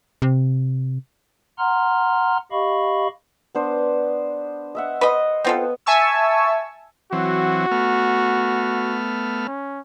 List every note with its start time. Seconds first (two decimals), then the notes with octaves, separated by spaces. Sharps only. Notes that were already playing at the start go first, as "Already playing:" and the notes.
0.22 C3
1.58 F#5 A#5 C6 F6
2.52 G4 D#5 F5 B5 C#6
3.55 B3 D4 C5
4.75 D#5 E5 F#5
5.01 B4 C5 D#5 D#6
5.44 B3 C4 F4 A4
5.86 E5 G#5 A5 C#6 E6
7.13 E3 F#3 C4 F#4
7.71 A3 B3 F6
9.47 C#4